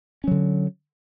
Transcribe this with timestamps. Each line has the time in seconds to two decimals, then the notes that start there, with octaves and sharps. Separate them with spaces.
0.24 C#4
0.28 F#3
0.31 D3